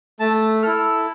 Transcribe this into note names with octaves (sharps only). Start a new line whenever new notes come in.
A3 A5
E4 A4 F6